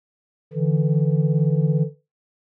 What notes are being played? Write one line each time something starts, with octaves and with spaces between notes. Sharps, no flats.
D3 E3